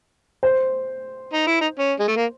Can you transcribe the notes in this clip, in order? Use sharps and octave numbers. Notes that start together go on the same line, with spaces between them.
C5
D#4
E4
D#4
C#4
G#3
A3
A#3